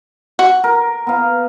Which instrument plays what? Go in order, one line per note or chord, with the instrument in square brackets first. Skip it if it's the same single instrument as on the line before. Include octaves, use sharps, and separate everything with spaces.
[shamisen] F#4
[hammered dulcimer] A#4
B3 F5